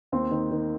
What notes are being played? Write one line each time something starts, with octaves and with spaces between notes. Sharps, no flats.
D#2 C4
D#3
D#3